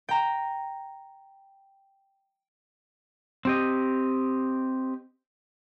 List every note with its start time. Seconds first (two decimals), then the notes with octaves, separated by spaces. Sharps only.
0.09 G5 A#5
3.45 C4 G4 D#5